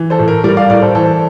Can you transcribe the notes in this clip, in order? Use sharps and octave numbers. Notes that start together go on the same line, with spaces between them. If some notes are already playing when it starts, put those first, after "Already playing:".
Already playing: E3
A4 C5
A2
A#4
G3 A#4 D5
D5 F5
A2 A#4 D5
A4 C5
E3 A4 C5